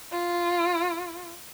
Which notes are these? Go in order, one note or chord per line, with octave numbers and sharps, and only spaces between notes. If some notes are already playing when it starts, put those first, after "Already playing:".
F4